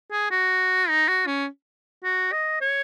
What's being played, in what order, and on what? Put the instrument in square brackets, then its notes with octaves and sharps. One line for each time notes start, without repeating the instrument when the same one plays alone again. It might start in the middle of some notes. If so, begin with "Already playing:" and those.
[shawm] G#4
F#4
D#4
F#4
C#4
F#4
D#5
C#5